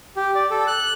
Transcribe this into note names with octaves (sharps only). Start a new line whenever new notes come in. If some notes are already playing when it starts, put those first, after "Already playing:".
G4
D5
A4
F#6